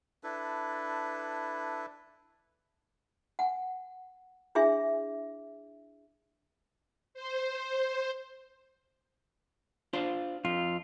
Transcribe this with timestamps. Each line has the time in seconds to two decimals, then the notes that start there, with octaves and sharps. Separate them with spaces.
0.24 D4 E4 A4 B4
3.39 F#5 G#5
4.55 D4 E4 G#4 E5 G#5
7.14 C5
9.93 D4 F4 C5
10.45 F2 F4